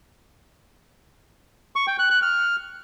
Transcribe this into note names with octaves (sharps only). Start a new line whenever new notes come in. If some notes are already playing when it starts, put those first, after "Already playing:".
C#6
G5
F#6
F#6
F6